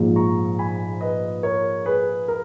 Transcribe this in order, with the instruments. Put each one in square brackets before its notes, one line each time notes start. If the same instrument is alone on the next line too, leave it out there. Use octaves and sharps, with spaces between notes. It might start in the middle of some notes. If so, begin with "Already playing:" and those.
Already playing: [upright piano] A#1 G#2 F3
[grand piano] A#5 C#6
G#5 B5
B4 D#5
A#4 C#5
G#4 B4
A#4